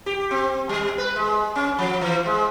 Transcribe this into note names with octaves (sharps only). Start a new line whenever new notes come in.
G4
C4
G3
B4
G#3
C#4
F3
E3
G#3